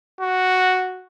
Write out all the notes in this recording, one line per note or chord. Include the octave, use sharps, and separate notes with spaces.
F#4